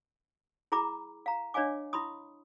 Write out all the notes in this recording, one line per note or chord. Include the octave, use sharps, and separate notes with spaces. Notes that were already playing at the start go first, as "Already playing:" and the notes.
E4 G#4 A#5 B5 D6
F5 A#5
D4 C#5 D#5 F5 G#5 D6
E4 B5 C6 D#6